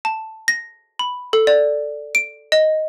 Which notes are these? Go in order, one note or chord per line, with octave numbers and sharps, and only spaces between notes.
A5
A#6
B5
A4
D5
D7
D#5